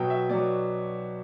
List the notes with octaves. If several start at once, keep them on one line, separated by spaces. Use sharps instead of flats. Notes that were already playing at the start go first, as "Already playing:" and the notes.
Already playing: B2 F#3 G5
E5
B2 F#3 D5